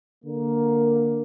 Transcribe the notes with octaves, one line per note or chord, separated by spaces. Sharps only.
D3 A#3